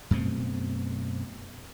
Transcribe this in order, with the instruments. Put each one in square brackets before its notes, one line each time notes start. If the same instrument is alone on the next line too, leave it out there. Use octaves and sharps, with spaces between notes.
[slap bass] F#2 B2 A3 C4